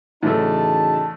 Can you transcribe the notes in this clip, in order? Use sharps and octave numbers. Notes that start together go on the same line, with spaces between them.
E2 A2 C#3 E3 F#3 A3 D#4 A5